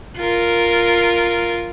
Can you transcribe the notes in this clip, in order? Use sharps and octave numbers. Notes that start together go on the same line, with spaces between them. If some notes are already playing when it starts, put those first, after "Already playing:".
F4 A#4